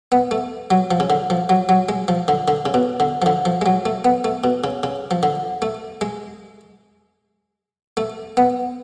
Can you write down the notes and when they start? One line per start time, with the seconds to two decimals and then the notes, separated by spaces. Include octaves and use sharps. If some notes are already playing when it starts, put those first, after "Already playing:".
0.12 B3
0.31 A3
0.71 F#3
0.91 F3
1.00 C#3
1.10 D3
1.30 F3
1.49 F#3
1.69 F#3
1.89 G#3
2.08 F3
2.28 D3
2.48 D3
2.66 C#3
2.74 B2
3.00 D3
3.22 F3
3.26 D3
3.45 F3
3.62 G#3
3.66 F#3
3.86 A3
4.05 B3
4.24 A3
4.44 B2
4.64 C#3
4.83 C#3
5.11 F3
5.23 D3
5.62 A3
6.01 G#3
7.97 A3
8.37 B3